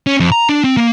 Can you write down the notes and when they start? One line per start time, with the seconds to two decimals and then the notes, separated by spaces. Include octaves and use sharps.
0.07 C#4
0.20 F2
0.32 A#5
0.49 D4
0.64 C4
0.77 A#3